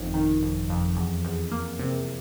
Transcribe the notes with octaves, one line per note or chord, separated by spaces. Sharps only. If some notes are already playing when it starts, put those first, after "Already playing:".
Already playing: G1 F2 C3 D#3
D#3
F2
F2
E2
E2
A#3
C3